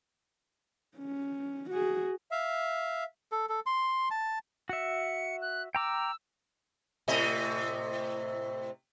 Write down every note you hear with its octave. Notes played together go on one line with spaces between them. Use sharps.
C#4
F#4 G#4
E5 F5
A4
A4
C6
A5
F#4 E5 C#7
F#6
G5 A#5 D6 E6
A2 C3 D#5